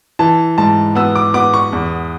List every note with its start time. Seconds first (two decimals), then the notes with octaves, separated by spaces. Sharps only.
0.19 E3 A5
0.58 G#2 A5
0.95 B3 E6
1.16 D6
1.34 B3 D6
1.54 C#6
1.73 E2